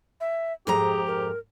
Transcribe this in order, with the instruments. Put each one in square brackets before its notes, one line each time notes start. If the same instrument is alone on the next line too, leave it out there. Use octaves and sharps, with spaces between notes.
[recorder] E5
[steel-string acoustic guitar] F2 G#2 A#5 [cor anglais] G4 [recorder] G#4
[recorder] A#4